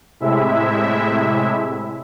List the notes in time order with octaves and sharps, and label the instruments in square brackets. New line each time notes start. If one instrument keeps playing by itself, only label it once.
[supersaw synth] A2 C3 G#3 E4 E5